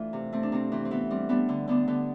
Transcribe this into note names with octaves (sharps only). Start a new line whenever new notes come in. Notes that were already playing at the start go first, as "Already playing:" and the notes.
Already playing: E3 A3 D4 F4
C3
A3 C4
D4
C3 C4
E3 C4
C4
E3 B3
G3 C4
G3 B3 D4
D3
D3 B3 D4
D3 B3